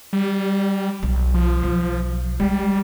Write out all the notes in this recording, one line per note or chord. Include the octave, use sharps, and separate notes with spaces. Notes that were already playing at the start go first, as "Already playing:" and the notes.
G3
B1
F3
B1
G3 G#3